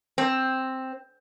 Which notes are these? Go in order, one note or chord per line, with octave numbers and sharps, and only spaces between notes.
C4